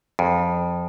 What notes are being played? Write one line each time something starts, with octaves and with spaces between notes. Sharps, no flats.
F2